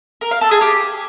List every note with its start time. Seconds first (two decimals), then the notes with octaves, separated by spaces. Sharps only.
0.21 A#4
0.31 F5
0.41 A4
0.51 G#4
0.61 G4